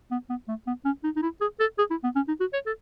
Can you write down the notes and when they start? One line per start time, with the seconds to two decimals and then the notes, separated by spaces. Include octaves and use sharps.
0.11 B3
0.30 B3
0.48 A3
0.67 B3
0.85 C#4
1.04 D#4
1.16 D#4
1.22 E4
1.41 G#4
1.60 A4
1.79 G#4
1.91 E4
2.04 B3
2.16 C#4
2.28 D#4
2.40 F#4
2.53 C#5
2.66 A4